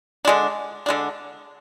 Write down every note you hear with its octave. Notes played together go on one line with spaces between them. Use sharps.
D3 G#3 D4
D3 G#3 D4